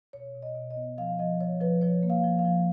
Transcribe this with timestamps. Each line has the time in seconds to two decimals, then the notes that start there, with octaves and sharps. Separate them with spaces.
0.13 B2 C#5
0.35 B2
0.42 D#5
0.55 B2
0.71 D#5
0.76 B3
0.98 F3 F5
1.19 F3 D#5
1.40 F3 C#5
1.61 F3 B4
1.82 F3 C#5
2.03 A#3
2.10 F5
2.24 F3
2.39 F5
2.45 F3